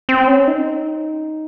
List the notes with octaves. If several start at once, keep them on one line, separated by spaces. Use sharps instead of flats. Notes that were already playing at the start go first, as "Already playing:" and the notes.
C4
C#4
D#4